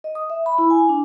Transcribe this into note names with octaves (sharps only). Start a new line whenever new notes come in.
D#5
D#6
E5
B5
E4
G#5
D4